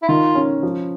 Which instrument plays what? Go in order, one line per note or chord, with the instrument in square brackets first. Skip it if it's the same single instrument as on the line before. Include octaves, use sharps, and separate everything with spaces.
[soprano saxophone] E4
[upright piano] D#3 [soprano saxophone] F4
[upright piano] C#4
F3